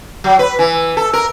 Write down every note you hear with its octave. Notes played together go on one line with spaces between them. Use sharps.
F#3
B4
E3
A4
A#4